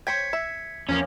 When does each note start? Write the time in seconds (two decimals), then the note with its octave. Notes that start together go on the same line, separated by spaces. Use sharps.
0.07 C5 C#5 G5 G#6 B6 C#7
0.33 E5
0.89 E2 F3 A#3 C#4